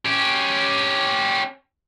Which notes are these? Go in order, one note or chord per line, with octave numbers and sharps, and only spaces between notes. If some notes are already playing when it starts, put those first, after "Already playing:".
C#4 G4